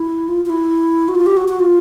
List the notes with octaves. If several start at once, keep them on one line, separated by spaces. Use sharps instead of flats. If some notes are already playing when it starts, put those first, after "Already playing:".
Already playing: E4
F4
F4
E4
F#4
F4
G4
F#4
F#4
F4